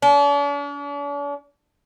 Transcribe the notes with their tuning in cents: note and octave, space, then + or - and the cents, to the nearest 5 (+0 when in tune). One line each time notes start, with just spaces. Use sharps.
D4 -45